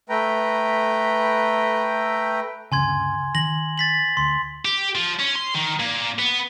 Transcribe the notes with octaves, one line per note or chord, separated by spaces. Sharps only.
A3 B4 G5 A#5
G1 D2 C#3 G#5 C6 G#6
D#3 A#6 F#7
A6 B6 F#7
D2 C6
G4
F3
C#4
C6
D#3
A#2
B3